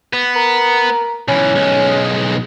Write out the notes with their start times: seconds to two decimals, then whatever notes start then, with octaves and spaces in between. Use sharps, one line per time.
0.13 B3
0.36 A#4
1.28 B1 E3 C#4
1.56 B1 G#3